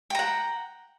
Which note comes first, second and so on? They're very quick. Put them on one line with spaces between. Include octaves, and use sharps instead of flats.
G5 A#5 F#5